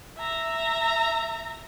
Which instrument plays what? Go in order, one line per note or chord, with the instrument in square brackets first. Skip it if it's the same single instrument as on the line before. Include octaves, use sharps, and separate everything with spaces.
[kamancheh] E5 A#5